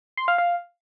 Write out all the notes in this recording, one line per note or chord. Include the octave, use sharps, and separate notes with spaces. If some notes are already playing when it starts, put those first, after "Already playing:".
C6
F5
F5